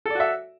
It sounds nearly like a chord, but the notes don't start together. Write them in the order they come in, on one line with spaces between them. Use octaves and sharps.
A4 D5 F#4 E5